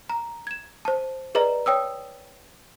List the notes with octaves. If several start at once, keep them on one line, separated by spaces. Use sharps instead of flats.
A#5
G#6 E7
C5 A5
G#4 B4 D5 D#5 A#5
C#5 G5 D#6 E6